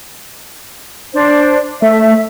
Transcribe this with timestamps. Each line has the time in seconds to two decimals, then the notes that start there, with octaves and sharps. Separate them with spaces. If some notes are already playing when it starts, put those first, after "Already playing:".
1.13 D4 C5
1.82 A3 E5